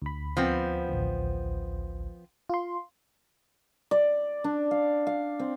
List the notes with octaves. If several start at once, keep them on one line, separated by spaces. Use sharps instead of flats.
D2 B5
F3 B3 C4
A1 D2
F4 C6
D5
D4
F5
F5
C4